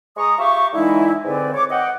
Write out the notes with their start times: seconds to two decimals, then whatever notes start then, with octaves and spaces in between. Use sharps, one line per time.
0.17 G#3 A#5 C#6 D#6
0.39 F4 G4 E5 C#6
0.73 D3 E3 G#3 D#4 E4
1.25 G#2 D3 C4 B4 D5 G#5
1.54 C#5 D6
1.71 D#5 F#5 G5